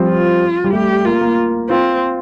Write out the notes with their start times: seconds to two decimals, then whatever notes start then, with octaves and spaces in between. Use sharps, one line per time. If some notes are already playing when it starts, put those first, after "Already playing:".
Already playing: F3 G3 C4
0.09 F4
0.64 G3
0.73 A3 G4
1.05 A#3 F4
1.21 A#3
1.69 C4 F4